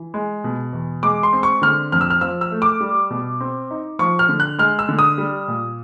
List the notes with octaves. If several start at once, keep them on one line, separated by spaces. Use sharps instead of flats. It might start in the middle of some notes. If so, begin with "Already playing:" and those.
Already playing: E3
G#3
B2
E2
G#3 D6
C6
C4
C#6
D3 F6
F2 F6
E6
F6
F3 E6
E6
A3
D6
G3
B2
C4
D#4
F3 C#6
F6
D3
F#6
G#3 F6
E6
D3
D#6
G3
A#2